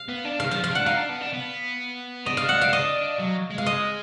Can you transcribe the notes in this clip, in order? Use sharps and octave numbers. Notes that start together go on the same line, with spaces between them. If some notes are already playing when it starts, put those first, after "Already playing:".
Already playing: F5
B3
D4
D#3 F5
F3 F#3 F5
F5
D4 F#5
D#4 F5
D4
B3
D4
B3
D4 D#5
F5
F#5
F5
D#5
F#3
G#3
F5
D#5